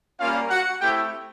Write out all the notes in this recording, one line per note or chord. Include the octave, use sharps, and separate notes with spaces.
G3 A#3 C#4 F4 F5
F#4 F#5
A3 C4 E4 G4 G5